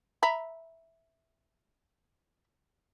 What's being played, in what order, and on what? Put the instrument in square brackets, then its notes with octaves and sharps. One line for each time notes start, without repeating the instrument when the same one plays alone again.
[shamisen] E5 A#5 B5